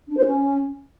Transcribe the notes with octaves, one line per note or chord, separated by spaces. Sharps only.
D4
C5
C#4